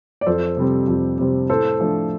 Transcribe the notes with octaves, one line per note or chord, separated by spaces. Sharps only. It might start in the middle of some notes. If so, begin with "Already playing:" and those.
D5
F2 A4 C5
C3 G3 C4
F2
C3 G3 C4
A2 A4 C5
F3 A3 D4